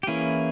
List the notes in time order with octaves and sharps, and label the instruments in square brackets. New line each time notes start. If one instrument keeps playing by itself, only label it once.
[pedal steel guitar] G4
E3 A#3 C#4 E4 G#4